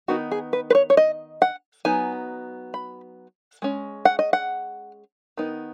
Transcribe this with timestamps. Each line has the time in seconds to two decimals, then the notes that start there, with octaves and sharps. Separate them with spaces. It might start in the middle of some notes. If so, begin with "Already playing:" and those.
0.08 D#3 B3 D#4 F#4
0.32 G#4
0.53 B4
0.70 B4
0.75 C#5
0.90 C#5
0.97 D#5
1.42 F#5
1.85 F#3 B3 D#4 G#5
2.74 B5
3.62 G#3 C#4
4.05 F#5
4.19 D#5
4.33 F#5
5.37 D#3 B3 D#4